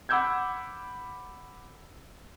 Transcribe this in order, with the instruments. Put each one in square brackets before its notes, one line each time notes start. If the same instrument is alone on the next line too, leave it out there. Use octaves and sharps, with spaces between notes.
[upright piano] F#5 B5 D6 E6 G6 G#6